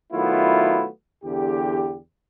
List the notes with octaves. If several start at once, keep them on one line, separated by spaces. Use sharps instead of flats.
D#3 F#3 A3 B3 E4 F4
E2 D3 G4